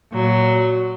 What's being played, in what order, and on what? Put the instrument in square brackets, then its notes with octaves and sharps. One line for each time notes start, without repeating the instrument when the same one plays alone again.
[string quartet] A#2 F#3